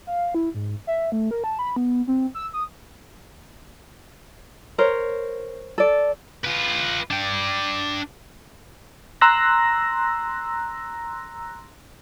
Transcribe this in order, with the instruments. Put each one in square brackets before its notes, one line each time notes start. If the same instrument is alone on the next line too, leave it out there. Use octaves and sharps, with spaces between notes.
[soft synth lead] F5
E4
G#2
E5
A3
A#4
A5
B5
B3
C4
E6
D#6
[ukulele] A#4 C5 C#5
A4 D5
[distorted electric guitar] F4 B4
D4 G5
[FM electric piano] A#5 C6 E6 F#6 A#6